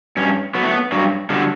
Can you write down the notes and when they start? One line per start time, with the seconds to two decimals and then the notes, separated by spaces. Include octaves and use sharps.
0.17 G2 C#4
0.55 F#3 B3
0.63 A3
0.71 B3
0.92 G2 F#3
1.30 D3 F#3 G3